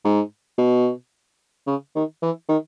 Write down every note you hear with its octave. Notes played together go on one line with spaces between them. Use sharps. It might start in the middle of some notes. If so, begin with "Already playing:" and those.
G#2
B2
C#3
D#3
E3
D#3